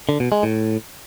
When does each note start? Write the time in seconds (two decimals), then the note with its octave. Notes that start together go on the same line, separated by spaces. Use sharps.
0.09 D3
0.20 B2
0.32 G#3
0.43 A2